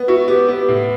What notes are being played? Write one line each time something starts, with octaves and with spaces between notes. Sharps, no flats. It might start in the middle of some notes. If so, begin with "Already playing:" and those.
Already playing: B3
E4 F#4
B3 G4
B3
A2